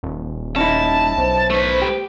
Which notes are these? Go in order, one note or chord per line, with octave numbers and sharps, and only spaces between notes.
D#1
C#4 D#4 E4 A5
B1 C5
A3 B4
G4